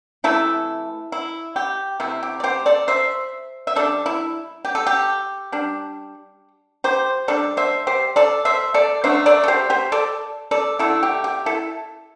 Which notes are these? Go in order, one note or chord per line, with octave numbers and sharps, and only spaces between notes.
C3 E3 A3 E4 A4
E4
G4
C3 A3 E4
G4
D5
G4 C5
A4 D5
C5 E5
E5
G3 D4 A4 D5
E4
G4
A4
G4
G3 D4
G4 C5
G3 D4 A4 D5
C5 E5
G4 C5
A4 D5
C5 E5
A4 D5
D3 A3 D4 C5 E5
A4 D5
A4
G4 C5
G4 C5
A4 D5
A4 D5
D3 A3 D4 E4 A4
G4
G4
E4 A4